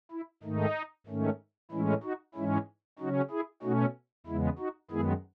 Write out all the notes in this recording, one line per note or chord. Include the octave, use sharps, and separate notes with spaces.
E4
G#2 D#3 A3 D#4
G#2 D#3 A3 C#4
A2 E3 G#3 C#4 E4
D#4 F#4
G#2 E3 G#3 C#4 E4
C#3 F#3 C#4 D#4 F#4
E4 G#4
B2 A3 C#4 D#4 F#4
E2 C#3 G#3 B3 E4
D#4 F#4
F#2 D#3 G#3 B3 E4 G#4